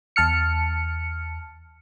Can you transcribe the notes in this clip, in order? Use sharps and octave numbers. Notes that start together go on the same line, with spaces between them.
E2 A5 F6 C#7